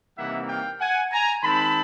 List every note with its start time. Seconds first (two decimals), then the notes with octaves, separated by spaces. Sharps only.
0.17 C3 E3 G3 A#3 D#4 E5 F#5
0.49 F5 G5
0.80 F#5 G#5
1.12 G#5 A#5
1.43 D#3 G#3 C4 A5 B5